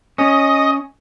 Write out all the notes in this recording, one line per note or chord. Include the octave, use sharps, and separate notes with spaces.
C#4 D#5